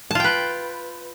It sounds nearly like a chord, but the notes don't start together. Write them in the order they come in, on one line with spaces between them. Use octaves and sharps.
A5 F4 G5 B4